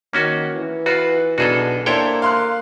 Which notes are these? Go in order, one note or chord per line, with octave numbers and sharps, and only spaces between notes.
D#3 A#3 C#4 F#4
E3
F4 F#4 B4
B1 D4 F#4 G#4 A4 B4
A#3 D4 E4 A4 C5 C#5 G5
F5 C6 F#6